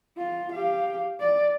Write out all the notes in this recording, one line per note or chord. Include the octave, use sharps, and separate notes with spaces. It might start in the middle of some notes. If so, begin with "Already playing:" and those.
F4
G4 F5
D5